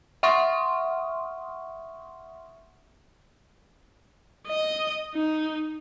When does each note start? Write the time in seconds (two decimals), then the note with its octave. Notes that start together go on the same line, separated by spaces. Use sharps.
0.23 E5 F#5 C6 C#6 D#6 F6
4.47 D#5
5.14 D#4